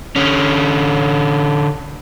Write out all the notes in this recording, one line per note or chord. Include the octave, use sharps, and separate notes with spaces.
D3 C#4